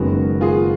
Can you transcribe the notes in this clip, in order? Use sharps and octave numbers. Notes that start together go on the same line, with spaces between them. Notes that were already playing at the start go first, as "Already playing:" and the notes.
Already playing: F#1 F#2 D#3 G#3 B3 F#4 A#4
F4 G#4